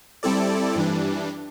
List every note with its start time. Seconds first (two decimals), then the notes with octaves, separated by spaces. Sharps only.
0.23 G3 C4 E4 A4 D5
0.75 G2 E3 G3 D4